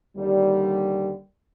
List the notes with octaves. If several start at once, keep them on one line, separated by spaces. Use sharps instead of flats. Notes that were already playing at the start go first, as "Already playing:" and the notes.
D#2 D3 G3